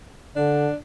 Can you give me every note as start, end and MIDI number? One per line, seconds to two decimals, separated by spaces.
0.36 0.68 50
0.36 0.75 62